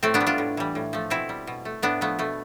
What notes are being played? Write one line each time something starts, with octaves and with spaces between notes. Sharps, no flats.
A2 A3 C4
B3 D4
G3
D4 F4
A2
E3 G3
A2
F3 A3
B2 C4 E4
G3
B2
A3
A2 B3 D4
F3 A3 B3
B2 A3